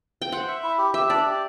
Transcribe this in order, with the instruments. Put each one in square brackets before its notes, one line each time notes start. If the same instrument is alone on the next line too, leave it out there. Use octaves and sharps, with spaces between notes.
[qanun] G5
[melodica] C5 [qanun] F#5
[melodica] E5
E4
G4
[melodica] G4 [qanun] E5
[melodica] D4 [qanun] D5
[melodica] G4